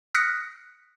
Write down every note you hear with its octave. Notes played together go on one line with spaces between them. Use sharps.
D#6 F6 F#6 A#6 B6 C#7